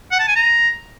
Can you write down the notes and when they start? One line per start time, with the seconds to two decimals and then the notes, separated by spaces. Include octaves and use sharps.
0.11 F#5
0.19 A5
0.28 G#5
0.36 A#5